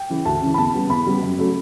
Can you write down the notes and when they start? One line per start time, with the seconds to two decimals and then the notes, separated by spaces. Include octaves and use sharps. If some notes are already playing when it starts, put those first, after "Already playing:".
Already playing: G5
0.10 C#3 E3
0.25 D2 A5
0.42 C#3 E3
0.54 B5
0.58 E2 A5
0.74 C#3 G3 B3
0.89 E2 B5
1.05 C#3 G3 B3
1.23 F#2
1.38 C#3 F#3 A3